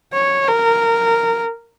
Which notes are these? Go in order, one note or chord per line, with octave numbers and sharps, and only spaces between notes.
C#5
A#4